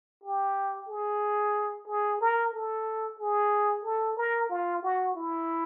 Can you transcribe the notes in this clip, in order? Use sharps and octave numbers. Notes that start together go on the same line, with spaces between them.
G4
G#4
G#4
A#4
A4
G#4
A4
A#4
F4
F#4
E4